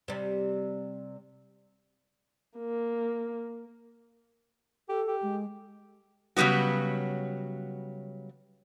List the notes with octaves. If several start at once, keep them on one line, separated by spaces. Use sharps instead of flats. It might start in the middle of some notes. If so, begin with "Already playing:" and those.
C3 G3
A#3
G4 A4
G4
G#3
C#3 F#3 G3 B3 F#4